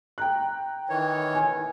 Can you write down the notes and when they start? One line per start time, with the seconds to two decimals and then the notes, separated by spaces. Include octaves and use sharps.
0.18 G5 A#5 F#6
0.89 D#3 E3 C#5
1.35 G#5